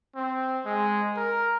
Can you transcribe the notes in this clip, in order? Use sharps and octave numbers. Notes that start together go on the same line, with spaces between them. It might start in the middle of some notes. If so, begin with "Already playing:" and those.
C4
G#3
A#4